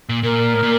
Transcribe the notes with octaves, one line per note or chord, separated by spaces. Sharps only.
A#2
A#2 A#4
A2
A#2